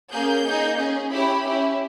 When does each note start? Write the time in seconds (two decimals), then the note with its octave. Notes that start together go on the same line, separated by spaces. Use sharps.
0.11 A#3 C#4 G#4 G6
0.46 A#3 D#4 G#4
0.79 C#4 G#4
1.12 C#4 E4 G4 B5
1.46 C#4 E4 G4